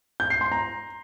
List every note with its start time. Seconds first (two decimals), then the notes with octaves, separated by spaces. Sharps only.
0.20 G6
0.30 C7
0.41 C6
0.52 A#5